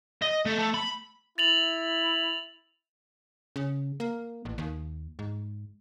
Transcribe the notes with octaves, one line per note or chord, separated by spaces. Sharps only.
D#5
A3
A3
B5
E4 A6 F7 F#7
C#3
A#3
A1
D#2
G#2